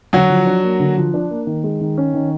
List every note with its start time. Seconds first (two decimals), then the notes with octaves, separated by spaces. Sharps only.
0.13 D3 F#3 F#4
0.30 F3
0.47 D4
0.64 A#3
0.80 D3
0.98 F3
1.14 D4
1.31 A#3
1.47 D#3
1.64 G#3
1.81 D#3
1.98 C#4
2.14 D#3